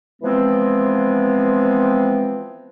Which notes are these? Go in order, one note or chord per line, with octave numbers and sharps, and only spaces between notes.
E3 F3 G#3 B3 C4